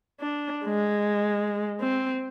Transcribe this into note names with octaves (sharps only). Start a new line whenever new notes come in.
D4
G#3
C4